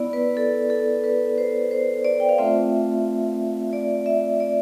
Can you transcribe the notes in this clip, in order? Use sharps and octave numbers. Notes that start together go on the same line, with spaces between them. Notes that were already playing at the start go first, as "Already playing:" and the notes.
Already playing: B3 E4 D5
B4
A4
A4
B4
C5
C5
D5
G5
F5
A3 C4 F4 E5
D5
E5
D5